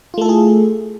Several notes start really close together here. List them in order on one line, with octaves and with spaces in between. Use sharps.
F4 A3 A4 E4 G#4